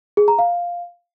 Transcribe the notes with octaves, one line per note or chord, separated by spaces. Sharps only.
G#4
A#5
F5